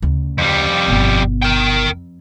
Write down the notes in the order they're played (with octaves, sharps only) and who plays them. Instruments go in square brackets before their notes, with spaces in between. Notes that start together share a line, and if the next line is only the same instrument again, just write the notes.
[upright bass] D2 C#3
[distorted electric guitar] F2 G3
[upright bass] G1 B2
[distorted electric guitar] A#4 G5
[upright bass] F2